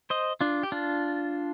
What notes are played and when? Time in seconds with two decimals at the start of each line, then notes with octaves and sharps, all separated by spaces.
0.10 C5 D#5
0.41 D4 F4
0.63 G4
0.72 D4 F4